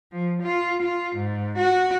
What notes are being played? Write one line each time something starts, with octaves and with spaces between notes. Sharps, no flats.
F3
F4
F4
G#2
F#4